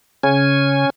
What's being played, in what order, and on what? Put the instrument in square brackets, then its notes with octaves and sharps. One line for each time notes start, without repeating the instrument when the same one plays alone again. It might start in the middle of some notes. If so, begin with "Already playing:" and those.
[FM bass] C#3 [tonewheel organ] C#4 G#5